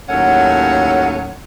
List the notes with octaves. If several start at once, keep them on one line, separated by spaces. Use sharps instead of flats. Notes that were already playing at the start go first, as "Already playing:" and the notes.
D#2 A2 F#3 C#4 A4 F#5